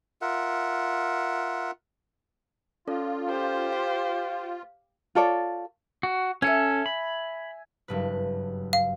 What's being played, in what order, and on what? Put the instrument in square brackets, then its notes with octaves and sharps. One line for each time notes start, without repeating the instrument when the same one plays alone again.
[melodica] F4 A#4 E5 F#5
[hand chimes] C#4 A4 D5 [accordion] F4
[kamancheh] G4 C5
[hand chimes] F5
[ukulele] F4 A4 C#5 D5
[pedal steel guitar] F#4
[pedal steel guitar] C#4 A4 [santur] E5 G#5
[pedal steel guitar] B5
[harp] F#1 G2 B4
[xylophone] F5